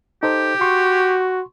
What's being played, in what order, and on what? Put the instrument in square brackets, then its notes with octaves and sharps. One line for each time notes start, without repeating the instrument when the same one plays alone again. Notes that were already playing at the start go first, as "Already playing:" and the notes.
[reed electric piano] D#4 A4 C5 [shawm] G4
[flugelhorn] F#4 [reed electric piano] C6 C#6